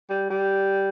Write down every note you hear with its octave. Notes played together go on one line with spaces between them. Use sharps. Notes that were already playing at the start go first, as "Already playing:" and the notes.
G3
G3